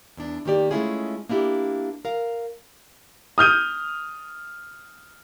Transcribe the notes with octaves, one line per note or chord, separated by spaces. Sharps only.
E2 D4
D#3 A#3 G4 D5
G#3 A3 C#4 E4 F4 G#4
A#3 D4 E4 G4
A#4 F5
D#6 F6 G6 D#7